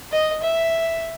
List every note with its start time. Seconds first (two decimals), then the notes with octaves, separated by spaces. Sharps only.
0.12 D#5
0.42 E5